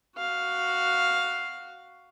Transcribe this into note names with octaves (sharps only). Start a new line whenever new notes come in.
F#4 F5